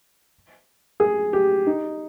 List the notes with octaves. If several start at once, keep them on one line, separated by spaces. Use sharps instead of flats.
G#4
G4
D#4